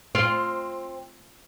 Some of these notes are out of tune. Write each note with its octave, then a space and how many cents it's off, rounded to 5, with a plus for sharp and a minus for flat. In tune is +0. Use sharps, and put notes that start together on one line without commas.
C4 +20 F4 +0